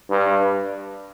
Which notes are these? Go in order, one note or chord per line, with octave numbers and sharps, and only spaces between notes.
G2